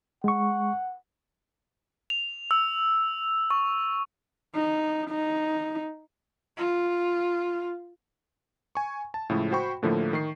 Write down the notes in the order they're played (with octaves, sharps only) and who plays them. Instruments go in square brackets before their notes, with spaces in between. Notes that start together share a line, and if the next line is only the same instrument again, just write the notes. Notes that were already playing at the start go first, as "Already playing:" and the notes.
[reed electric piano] G#3 C#6 [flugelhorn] F#5
[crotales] F7
E6
C#6
[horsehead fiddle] D#4
D#4
F4
[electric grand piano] G#5 C#6
A5
A2 C#3 F3 G#3 A3 E4
F#4 C5 G5 B5 C#6
A2 D3 F3 A3 A#3 E4
D#3 C#6 C7